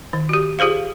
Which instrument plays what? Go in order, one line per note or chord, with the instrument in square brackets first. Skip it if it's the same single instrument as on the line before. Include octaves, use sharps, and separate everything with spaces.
[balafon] D#3
F#4 G4
F4 G4 G#4 C5 F5